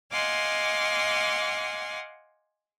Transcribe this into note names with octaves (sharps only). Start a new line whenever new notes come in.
D#5 F5 F#5 G#5 C6 D6